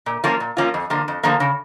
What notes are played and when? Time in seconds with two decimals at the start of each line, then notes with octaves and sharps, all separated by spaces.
0.06 A#2
0.24 F3 A#3 C#4 F4
0.40 A#2
0.57 F3 A#3 C#4 F4
0.74 F2
0.90 D3 F3 A#3
1.08 F2
1.23 D3 F3 A#3
1.40 C#3